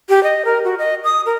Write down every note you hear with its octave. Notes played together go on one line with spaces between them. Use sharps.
G4
D#5
A#4
F#4
D#5
D#6
A#4